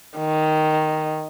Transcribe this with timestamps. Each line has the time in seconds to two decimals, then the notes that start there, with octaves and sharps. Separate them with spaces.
0.18 D#3